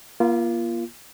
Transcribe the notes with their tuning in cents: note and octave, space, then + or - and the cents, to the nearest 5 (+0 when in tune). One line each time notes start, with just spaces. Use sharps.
A#3 +30 F4 -25